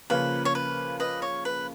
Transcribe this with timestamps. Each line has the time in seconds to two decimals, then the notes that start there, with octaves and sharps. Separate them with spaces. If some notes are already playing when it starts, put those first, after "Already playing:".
0.10 C#3 F3 A#3 C#4 F4 B4
0.45 C#5
0.55 B4
1.00 B4 D#5
1.22 C#5
1.45 B4